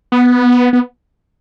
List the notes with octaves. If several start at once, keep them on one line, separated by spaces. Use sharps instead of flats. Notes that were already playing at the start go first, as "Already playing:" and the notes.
B3
B3